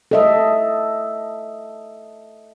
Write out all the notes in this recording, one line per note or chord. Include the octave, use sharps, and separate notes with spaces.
A4 D#5 E5